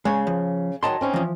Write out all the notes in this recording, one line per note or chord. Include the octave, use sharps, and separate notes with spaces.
C#3 G#3 C#5
F3
D#3 F#3 D#5 A5 C6
C4 C#4 D#4
E3 F3